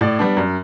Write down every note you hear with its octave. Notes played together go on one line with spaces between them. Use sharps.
A2 D5
G3 B3 D4
F#2